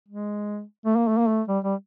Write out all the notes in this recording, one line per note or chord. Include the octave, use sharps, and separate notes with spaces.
G#3
A3
A#3
A3
A#3
A3
G3
G3